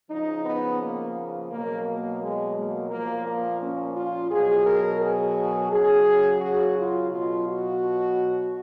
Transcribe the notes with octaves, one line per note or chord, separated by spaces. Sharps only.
C#3 F3 D#4
B3
A#3
B2 F#3 A#3
A#3
G#3
A#3
A#2 F3 A#3
A#3
C#4
F4
B2 F#3 G#4
A#4
G#4
C#3 F#3 G#4
F#4
F4
B2 F#3 F4
F#4